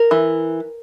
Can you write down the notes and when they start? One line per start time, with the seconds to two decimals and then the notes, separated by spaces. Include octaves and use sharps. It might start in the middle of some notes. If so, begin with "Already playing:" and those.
Already playing: A#4
0.11 E3